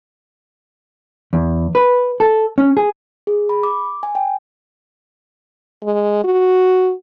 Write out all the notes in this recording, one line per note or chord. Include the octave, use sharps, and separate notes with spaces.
E2
B4
A4
C#4
G#4
G#4
B5
D6
G#5
G5
G#3
F#4